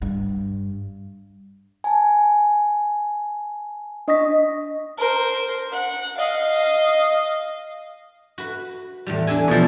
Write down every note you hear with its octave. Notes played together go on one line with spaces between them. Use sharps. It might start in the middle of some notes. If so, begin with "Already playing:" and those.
G2
G#5 A5
D4 D#5 C#6 D#6 A#6 B6
A#4 C5
F#5
D#5 F5
F#4 B4
E2 A2 G3
D4 A4 G#5
B2 F3